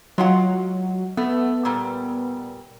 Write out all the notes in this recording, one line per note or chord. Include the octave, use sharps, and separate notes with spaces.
F#3 G#3 F4 F#5
A3 B3
A#2 G3